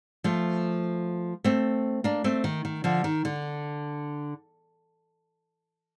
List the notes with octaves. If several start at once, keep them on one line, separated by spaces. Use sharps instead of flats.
F3 A3
A3 C4
A#3 D4
A3 C4
D#3
D#3
D3 F3
D#3
D3